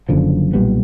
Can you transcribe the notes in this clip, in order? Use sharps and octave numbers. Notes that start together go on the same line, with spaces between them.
F#1 F#2 D3 F3
B1 A#2 G3 B3